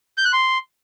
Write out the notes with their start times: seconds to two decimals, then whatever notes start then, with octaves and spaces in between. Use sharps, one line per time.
0.18 G6
0.25 F#6
0.33 C6